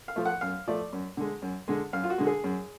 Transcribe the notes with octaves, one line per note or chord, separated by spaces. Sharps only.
F5
F3 A3
F#5
F#2 F5
F3 A3 D5
F#2
D3 G#3
F#2
D3 G#3
F#2 F5
F4
F#4
D3 G#3
G#4
F#2